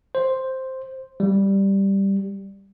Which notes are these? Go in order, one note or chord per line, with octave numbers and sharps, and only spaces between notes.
C5
G3